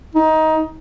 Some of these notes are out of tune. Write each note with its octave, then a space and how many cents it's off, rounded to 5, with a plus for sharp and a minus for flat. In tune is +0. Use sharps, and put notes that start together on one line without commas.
D#4 +20